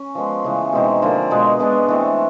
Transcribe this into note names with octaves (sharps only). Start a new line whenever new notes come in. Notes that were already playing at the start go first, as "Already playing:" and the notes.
Already playing: C#4
F3 G#3 B3
C#3 E3 A3
B2 G#3 C4 D#4
D3 F3 A#3
B2 G#3 B3
B2 G#3 B3 D4
E3 A3 C4